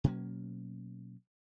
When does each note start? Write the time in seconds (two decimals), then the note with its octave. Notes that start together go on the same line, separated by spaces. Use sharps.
0.04 B2 F#3 A#3 C#4